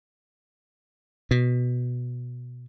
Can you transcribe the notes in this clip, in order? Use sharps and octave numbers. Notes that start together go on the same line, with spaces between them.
B2